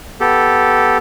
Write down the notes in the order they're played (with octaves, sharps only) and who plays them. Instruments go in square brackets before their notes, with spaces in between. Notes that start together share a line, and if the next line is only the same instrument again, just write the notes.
[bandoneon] B3 G4 A4